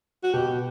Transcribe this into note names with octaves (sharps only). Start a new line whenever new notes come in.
F#4
B2 G4